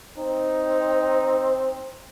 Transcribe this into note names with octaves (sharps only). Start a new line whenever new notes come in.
C4 D#4